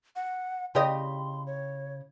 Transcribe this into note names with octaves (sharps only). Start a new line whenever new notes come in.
F#5
C#3 G4 D#5 C6
C#5